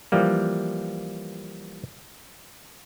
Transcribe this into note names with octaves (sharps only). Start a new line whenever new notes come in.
E3 F3 G3 A#3